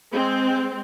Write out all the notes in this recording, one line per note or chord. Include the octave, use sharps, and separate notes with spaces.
G#3 C4